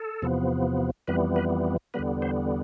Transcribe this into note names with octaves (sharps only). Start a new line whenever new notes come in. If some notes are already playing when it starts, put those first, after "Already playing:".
Already playing: A4
E2 C3 F3 B3
F2 E3 G3 B3 B4
B4
E2 D3 G3 B3 B4
C5